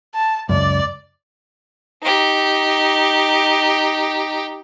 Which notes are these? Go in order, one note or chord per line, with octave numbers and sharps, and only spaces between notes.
A5
C#2 F#2 D5
D#4 G4